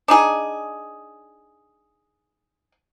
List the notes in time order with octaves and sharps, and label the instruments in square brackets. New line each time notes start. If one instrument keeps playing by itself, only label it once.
[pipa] D4 D#4 G#4